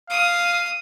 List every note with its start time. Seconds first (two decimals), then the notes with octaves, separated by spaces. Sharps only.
0.10 F5 D#6